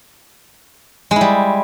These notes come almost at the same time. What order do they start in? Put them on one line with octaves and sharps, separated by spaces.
G#3 E4 G3